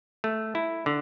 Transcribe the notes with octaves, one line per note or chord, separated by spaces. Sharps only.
A3
E4
D3